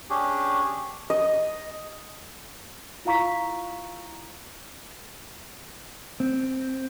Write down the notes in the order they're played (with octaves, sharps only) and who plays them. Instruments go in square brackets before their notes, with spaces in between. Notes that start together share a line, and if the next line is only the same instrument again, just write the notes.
[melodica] C#4 D4 G4 G#4
[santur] D#5
[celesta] E4 F4 F5 A#5 C#6 B6
[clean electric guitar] C4